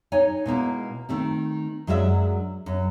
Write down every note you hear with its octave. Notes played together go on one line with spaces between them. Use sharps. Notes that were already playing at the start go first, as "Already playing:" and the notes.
D#4 C#5 G#5
B2 G#3 A#3 E4
D#3 A3 C4
F#2 F#3 G#3 D4 F4 E5
F#2